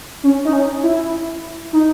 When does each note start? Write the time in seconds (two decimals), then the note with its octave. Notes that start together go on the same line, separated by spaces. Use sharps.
0.24 C#4
0.45 D#4
0.53 C#4
0.83 E4
1.73 D#4